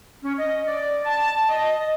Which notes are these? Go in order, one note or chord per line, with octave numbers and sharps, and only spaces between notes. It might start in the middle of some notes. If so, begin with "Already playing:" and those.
C#4
D#5
D5
A5
D#5